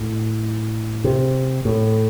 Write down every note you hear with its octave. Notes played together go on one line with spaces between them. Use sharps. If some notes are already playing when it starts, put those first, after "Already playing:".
Already playing: A2
C3
A2